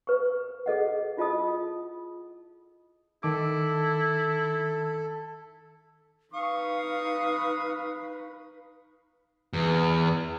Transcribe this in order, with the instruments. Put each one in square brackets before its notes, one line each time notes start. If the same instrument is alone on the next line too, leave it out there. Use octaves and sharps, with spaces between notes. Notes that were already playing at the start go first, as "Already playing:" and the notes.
[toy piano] B4 C#6
G#4 A4 D#5 F#5
E4 F4 D#5 A5 D#6
[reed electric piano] D#3 D6 [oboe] E4 [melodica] A4
[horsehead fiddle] D#4 B4 [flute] F5 [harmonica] C#6 D#6
[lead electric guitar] E2